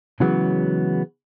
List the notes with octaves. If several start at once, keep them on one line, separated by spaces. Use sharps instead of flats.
C#3 E3 F#3 G#3 B3